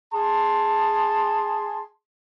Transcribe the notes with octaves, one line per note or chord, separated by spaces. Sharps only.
G#4 A5 C6